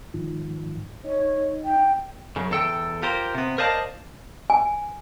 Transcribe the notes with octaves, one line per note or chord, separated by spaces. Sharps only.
G#2 D#3 F3
D#4 C#5
G5
F#2 C#3
E2 A4 G5
F4 G4 A#4 C5
C3 B3
A#4 C5 D5 D#5 F5 A5
G#5